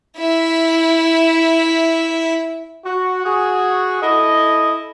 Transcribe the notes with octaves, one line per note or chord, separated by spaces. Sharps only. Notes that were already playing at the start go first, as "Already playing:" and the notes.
E4 E5
F#4
F#4 G#4
E4 A4 D#5